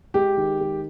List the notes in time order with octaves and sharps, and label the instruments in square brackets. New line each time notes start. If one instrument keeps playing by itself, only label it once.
[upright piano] G#3 G4
D#3
G#3